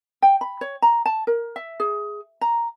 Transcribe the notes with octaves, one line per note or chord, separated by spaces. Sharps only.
G5
B5
C#5
A#5
A5
A#4
E5
G#4
A#5